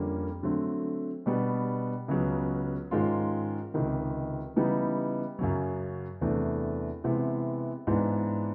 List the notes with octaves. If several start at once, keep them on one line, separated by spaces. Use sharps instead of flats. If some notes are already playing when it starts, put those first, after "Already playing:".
Already playing: F2 D3 G3 A#3 C#4
D3 F#3 A3 C4
B2 G3 B3 D4
C#2 C#3 F#3 B3
G#2 D#3 G#3 C#4 F4
C#2 C3 D#3
C#3 E3 G3 B3 D#4
F#2 C#3 F#3
E2 C3 E3 A3 D4
C3 E3 G#3 B3 E4
G#2 E3 G#3 B3 D4